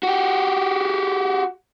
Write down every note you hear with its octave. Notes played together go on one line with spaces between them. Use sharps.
F#4 G4